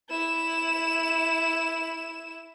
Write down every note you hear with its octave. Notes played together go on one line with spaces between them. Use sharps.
E4 E7